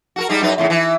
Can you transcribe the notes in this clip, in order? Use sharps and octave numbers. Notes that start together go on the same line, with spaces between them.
F#4 A4 A#4
G3 G#3 D#4
F#2 D#4 B4
E2 A2 C#3
E3